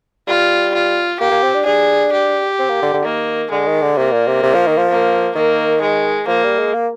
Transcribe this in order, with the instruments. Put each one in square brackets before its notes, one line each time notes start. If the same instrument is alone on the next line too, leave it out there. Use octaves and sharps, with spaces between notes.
[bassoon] G3 [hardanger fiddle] F4
[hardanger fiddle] F4
[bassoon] A#3 [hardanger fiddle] G4
[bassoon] A#3
C4
D4
[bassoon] D4 [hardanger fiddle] G#4
[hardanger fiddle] G4
[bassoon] C4
A#3
D3
D3
[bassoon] D#3 [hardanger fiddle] A#3
[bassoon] D3 [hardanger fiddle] G#3
[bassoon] D#3
D3
[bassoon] C3 [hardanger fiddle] A#3
[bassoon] A#2
C3
C3
F3
D#3
F3
[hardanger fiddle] A#3
[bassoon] D#3 [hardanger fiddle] A#3
[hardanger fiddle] G#3
[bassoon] F3 [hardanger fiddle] A#3
[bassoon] G3
G#3
A#3